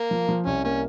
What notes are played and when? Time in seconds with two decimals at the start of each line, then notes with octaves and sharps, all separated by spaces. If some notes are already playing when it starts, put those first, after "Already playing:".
Already playing: A#3
0.11 F3
0.29 F3
0.46 C2 C#4
0.64 A#3 C#4